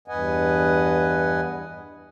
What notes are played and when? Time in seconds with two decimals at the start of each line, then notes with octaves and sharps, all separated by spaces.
0.08 E2 G2 B4 D#5 F#5 G#5